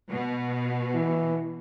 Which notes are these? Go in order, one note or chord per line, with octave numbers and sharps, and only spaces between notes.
B2
E3